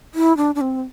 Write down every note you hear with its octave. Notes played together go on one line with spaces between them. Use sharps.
E4
D4
D4
C4